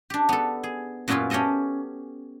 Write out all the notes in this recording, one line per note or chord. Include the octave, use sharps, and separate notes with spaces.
D4 G4
B3 A4
G#4
F#2 A#2 B3 C#4 E4 F4
C#4 G4 A4 D#5 E5